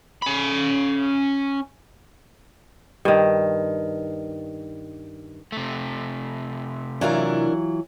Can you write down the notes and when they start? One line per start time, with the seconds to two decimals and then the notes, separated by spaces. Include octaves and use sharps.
0.22 C#4 B5
3.05 G2 D#3
5.52 C3 A3
7.01 E3 F#3 D4 E4 F4 A#4